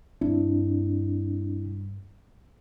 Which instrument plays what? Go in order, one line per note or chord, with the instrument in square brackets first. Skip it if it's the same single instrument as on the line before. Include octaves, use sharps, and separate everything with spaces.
[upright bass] G2 [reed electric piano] C4 D4 E4